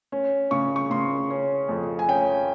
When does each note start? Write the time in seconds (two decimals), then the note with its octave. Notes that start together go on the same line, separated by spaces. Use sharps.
0.12 C#4
0.51 C#3 C#6
0.76 C#6
0.91 C#3 C6
1.30 C#4
1.69 F2
1.99 G#5
2.08 C#4 G5